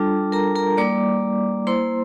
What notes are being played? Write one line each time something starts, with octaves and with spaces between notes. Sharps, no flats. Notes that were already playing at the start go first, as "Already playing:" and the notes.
Already playing: G3 D4 F4 A4 A5
A#4 A#5
A#4 A#5
G3 A#3 E4 D5 D6
A#3 E4 C5 C6